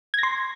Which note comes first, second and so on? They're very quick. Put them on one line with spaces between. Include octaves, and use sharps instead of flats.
G#6 A#6 C6